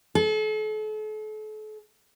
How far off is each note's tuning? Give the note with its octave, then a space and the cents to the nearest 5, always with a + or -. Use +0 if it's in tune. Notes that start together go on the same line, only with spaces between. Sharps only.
A4 -40